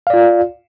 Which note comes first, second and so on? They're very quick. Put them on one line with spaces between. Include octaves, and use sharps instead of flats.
F5 D5 F4